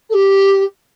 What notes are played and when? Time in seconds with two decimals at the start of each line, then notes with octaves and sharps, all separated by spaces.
0.10 A4
0.14 G4